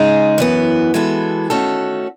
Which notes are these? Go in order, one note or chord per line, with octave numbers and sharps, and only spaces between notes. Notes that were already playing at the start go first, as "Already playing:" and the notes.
Already playing: C#3 G#3 D#4 G#4
F#2 E3 B3
E3 G#3 B3 F#4 A4
D#3 A3 C#4 F#4 A4